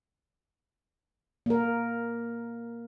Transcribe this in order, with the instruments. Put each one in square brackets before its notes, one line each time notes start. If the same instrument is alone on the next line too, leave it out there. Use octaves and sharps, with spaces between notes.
[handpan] A#3 A#4